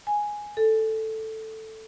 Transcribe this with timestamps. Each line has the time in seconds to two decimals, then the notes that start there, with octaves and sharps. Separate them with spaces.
0.07 G#5
0.57 A4